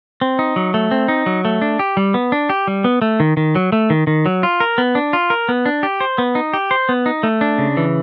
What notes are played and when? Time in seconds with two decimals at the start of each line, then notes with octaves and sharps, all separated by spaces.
0.21 C4
0.39 D#4
0.56 F#3
0.74 A3
0.91 C4
1.08 D#4
1.26 F#3
1.45 A3
1.62 D4
1.79 G4
1.97 G3
2.14 B3
2.32 D4
2.50 G4
2.67 G3
2.84 B3
3.02 A3
3.20 D#3
3.37 D#3
3.55 F#3
3.72 A3
3.90 D#3
4.07 D#3
4.26 F#3
4.43 F4
4.60 A#4
4.78 B3
4.95 D4
5.13 F4
5.30 A#4
5.49 B3
5.66 D4
5.83 G4
6.01 C5
6.18 B3
6.35 D#4
6.53 G4
6.71 C5
6.89 B3
7.06 D#4
7.23 A3
7.41 D4
7.58 C#3
7.77 E3